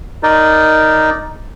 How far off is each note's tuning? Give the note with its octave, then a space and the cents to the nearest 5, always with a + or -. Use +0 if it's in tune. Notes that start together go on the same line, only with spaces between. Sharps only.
D#4 +0 A#4 +0 D5 +0